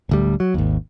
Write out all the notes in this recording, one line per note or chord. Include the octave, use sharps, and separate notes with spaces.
D1 D2 G3
F#3
G#1 D#2